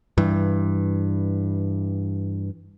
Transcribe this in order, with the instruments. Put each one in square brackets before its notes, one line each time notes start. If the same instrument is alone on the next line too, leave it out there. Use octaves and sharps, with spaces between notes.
[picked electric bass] G2 E3